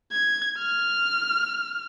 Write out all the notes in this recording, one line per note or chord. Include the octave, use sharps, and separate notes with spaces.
G#6
F6